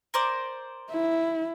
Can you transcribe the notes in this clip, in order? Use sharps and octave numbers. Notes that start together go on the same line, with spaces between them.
A#4 C5 D5
E4